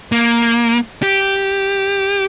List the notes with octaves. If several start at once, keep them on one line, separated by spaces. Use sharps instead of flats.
A#3
G4